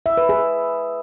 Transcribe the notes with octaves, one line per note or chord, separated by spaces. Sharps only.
E5
B4
G#4